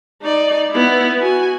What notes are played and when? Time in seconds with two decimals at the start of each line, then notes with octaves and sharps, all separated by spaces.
0.22 D#4 D5
0.71 B3 E4
1.21 F#4 G#5